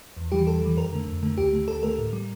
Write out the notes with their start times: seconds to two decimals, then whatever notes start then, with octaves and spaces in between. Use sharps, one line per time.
0.17 E2
0.32 E3 G3 G4
0.47 E2 A4
0.62 E3 G3
0.77 F2 A#4
0.92 D3 A3
1.07 F2
1.23 D3 A3
1.38 D2 G4
1.53 D3 A3
1.68 D2 A4
1.83 D3 A3 A#4
1.98 A2
2.13 G3